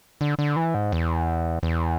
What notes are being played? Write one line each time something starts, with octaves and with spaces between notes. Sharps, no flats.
D3
D3
E3
G#2
E2
E2